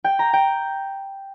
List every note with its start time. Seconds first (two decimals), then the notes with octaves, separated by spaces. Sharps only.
0.04 G5
0.19 A#5
0.33 G5